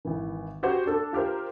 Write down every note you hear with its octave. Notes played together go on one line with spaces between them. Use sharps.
G#1 E3
F#4 G4 C5 F#5
D4 A4
F4 G4 A#4 C5